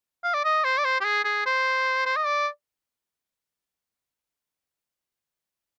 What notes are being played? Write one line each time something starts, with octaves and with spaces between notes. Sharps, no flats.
F5
D5
D#5
C5
D5
C5
G4
G#4
G#4
C5
C5
D#5
D5